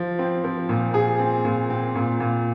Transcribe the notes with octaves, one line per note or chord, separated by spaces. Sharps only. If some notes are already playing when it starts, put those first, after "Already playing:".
Already playing: F3
C4
F3
A#2
G#4
C4
A#2
C4
A#2
A#2